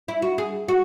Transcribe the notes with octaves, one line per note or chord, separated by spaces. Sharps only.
E4
F#4
G#4
F#4